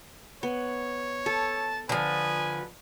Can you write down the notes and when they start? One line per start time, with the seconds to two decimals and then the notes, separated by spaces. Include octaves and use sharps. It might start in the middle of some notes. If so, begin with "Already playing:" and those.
0.43 B3 C#5
1.26 A4 A5
1.89 D3 F3 B4 G#5